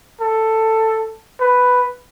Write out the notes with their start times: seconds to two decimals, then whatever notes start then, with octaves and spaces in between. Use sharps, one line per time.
0.21 A4
1.40 B4